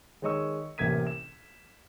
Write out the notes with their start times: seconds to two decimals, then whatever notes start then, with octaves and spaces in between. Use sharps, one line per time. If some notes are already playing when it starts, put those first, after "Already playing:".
0.22 D#3 G#3 C#5 D#5 C#6 E6
0.78 A1 C3 A#3 G#6 B6 D#7
1.07 E7